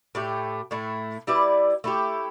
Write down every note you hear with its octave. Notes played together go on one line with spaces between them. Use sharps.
A2 A3 G4
A2 A3 E4
G3 E4 B4 D5
A3 E4 G4